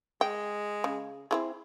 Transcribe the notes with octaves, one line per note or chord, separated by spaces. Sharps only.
G#3 G5
C#3
C4 E4 G#4